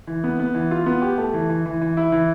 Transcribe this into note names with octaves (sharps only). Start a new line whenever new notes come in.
E3
B3
B3
E3
F4
B3
G4
A3
E3
E3
E3
E3
E4
E3